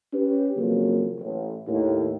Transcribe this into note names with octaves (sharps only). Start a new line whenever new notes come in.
C#4 G4 B4
F2 C#3 F#3 A#3
A1
D#2 A2